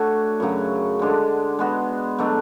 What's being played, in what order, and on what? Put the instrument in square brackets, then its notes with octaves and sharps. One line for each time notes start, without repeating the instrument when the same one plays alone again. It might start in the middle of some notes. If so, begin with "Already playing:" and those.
Already playing: [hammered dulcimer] A3 D4 F#4 C#5
F#2 C#3 F#3
D3 G#3 D4
G#3 B3 F#4
B2 F#3 A3 D4